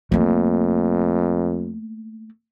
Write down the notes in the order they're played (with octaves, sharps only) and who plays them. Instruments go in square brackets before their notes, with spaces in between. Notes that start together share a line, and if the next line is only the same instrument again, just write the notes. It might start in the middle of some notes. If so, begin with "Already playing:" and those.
[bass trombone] F2 [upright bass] A3 A#3